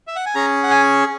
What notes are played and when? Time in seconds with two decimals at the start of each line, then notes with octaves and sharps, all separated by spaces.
0.07 E5
0.16 F#5
0.26 G#5
0.35 C#4 G#4 A#5
0.63 F#5
0.71 G#5